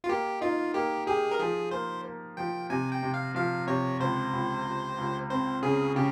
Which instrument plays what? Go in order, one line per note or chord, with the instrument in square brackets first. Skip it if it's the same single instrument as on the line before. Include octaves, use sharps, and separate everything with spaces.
[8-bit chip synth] F4
[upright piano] A#3 [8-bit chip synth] G4
[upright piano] D#4 [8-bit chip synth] F4
[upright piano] A#3 [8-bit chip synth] G4
[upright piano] G4 [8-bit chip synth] G#4
[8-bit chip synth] A#4
[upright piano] F3 [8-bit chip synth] G#4
[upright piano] A#3 [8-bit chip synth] C5
[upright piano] A#3
[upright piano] F3 [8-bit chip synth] G5
[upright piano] C3 [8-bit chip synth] G#5
[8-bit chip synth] G5
[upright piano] C3
[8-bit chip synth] F5
[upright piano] F3 [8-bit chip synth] F5
[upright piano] C3 [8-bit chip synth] C#5
[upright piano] C#2 [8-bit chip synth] C5
[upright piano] C#2
C#2
C#2
[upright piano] C4 [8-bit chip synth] C5
[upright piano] C#3 [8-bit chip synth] G#4
[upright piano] C#3 [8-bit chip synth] G4